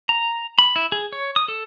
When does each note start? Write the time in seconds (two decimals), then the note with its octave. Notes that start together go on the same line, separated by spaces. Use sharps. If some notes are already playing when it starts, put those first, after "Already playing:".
0.09 A#5
0.59 B5
0.76 E4
0.92 G#4
1.13 C#5
1.36 D#6
1.48 A4